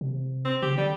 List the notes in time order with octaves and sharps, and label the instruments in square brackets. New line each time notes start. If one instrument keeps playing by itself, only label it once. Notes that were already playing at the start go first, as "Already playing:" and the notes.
[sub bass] C3
[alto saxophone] C4
[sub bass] C#3 [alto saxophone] G4
[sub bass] D3 [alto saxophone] G3